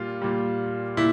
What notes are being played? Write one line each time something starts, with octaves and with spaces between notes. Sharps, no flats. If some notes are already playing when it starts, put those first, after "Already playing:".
Already playing: A#2 G3 F4
A#2 G3
A#2 E4